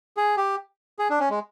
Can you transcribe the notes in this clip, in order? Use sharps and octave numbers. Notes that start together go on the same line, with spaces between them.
G#4
G4
G#4
D4
C#4
G#3